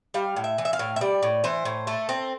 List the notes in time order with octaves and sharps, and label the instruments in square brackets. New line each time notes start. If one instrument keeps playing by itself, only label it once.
[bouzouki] G3 F5
A2
E5
E3
E5
F5
A2
E5
G3 D5
A2
E3 C5
A2
A3 A4
C4